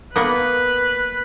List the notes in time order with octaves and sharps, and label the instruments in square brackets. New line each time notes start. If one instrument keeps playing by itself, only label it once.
[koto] A#3 B3 [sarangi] B4